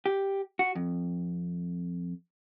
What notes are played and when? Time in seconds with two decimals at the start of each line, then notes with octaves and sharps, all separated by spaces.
0.06 G4
0.59 F#4
0.75 F2